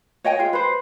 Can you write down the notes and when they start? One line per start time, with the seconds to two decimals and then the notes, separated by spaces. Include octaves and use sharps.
0.24 C#5 D#5 G5 G#5
0.39 F4 G#4
0.53 B4 C5